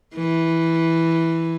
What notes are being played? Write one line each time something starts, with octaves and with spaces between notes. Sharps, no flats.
E3